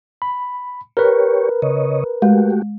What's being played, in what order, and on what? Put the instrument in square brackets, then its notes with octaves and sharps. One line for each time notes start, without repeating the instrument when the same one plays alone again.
[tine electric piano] B5
[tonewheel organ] G4 C#5 [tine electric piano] A#4 B4
[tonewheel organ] C#3 C#5 D#5
[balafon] G#3 [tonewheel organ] A3 F#4 G4